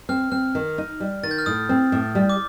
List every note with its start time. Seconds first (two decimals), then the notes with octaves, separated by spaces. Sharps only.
0.09 C4 F6
0.32 C4 F6
0.55 D#3
0.78 D#4
1.00 G3
1.23 D#3 A6
1.31 G6
1.38 F6
1.46 A2 D#6
1.69 C4
1.92 A2
2.15 G3
2.29 D6